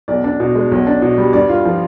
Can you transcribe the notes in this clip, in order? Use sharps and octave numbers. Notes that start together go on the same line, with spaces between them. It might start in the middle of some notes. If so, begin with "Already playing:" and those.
B1 D5
D4
B2
G#3
B1
D4
B2
G3
G2 D5
F4
F3